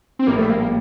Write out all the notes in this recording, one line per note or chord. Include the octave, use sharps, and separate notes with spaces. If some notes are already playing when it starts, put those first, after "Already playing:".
C4
A#1 A2 G3 A#3
A3
A#3
A#3